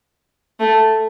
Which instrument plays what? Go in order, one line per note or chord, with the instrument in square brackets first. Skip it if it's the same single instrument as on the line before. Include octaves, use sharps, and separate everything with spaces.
[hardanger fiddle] A3